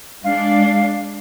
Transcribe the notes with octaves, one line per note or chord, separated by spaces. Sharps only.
G#3 D4 F5